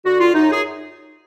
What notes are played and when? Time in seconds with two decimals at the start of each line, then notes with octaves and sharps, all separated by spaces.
0.05 D3 F#4
0.20 F4
0.33 F#2 D#4
0.52 G#4